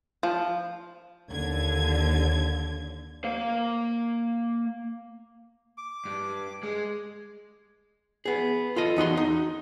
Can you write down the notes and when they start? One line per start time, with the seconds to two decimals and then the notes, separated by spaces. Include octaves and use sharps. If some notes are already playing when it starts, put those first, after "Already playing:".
0.23 F3
1.29 D#2 D3 G#6
3.24 A#3 F5
5.78 D6
6.05 G2
6.63 G#3
8.25 B3 G#4
8.76 F4 A4 D#5
8.96 E2 D#4 F#4 C6
9.17 D#4